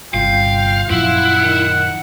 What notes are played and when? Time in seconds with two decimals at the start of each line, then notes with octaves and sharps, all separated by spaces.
0.14 G1 G2 C3 F4 F5 G5
0.91 F#2 A#2 F3 E4 F4 F#5
1.42 D#3